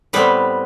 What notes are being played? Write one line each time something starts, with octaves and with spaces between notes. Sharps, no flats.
A2 G3 B3 C4 B4